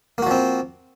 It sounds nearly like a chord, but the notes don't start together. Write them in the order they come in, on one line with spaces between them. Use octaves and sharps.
A#3 F#4 F3 C4